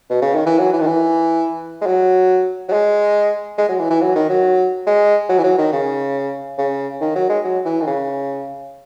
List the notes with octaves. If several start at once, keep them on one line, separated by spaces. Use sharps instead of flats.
B2
C#3
D#3
E3
F#3
E3
D#3
E3
G#3
F#3
F#3
G#3
G#3
F#3
E3
E3
F#3
D#3
F#3
G#3
F#3
E3
F#3
D#3
C#3
C#3
D#3
F#3
G#3
F#3
E3
D#3
C#3